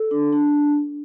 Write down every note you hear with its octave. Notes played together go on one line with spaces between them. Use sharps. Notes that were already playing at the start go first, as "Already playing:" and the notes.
Already playing: A4
D4
D4